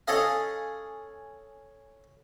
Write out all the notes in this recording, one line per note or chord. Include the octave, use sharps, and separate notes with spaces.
C#4 G#4 A4 D#5 F5